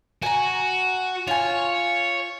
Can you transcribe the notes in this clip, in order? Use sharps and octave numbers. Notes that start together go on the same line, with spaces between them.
F#4 G#5 A#5
F4 C#5 G#5